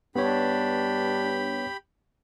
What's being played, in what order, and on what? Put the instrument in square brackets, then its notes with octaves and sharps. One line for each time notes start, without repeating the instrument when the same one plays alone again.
[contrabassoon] G2 [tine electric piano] B3 C#5 [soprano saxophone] D4 [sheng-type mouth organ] G4 B5